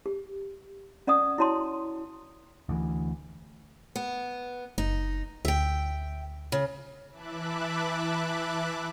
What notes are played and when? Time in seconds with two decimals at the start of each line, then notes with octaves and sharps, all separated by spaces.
0.06 G4
1.07 C#4 D5 F#5 D#6
1.38 E4 F#4 C#5 A5 C6
2.69 D2 E3
3.95 B3
4.78 F#1 D#4
5.45 D2 E5 G5
6.52 C#3
7.11 E3 E5 A5 B5 D6 F#6